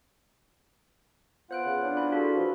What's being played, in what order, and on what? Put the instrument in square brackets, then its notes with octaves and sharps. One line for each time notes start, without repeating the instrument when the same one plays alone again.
[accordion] B3 F4 F#5 [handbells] C5 F#6 D7
[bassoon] C#3
D4
[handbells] E4 G#5 B5
[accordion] F4 A4 [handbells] F#4 G#4
[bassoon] F3 [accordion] B4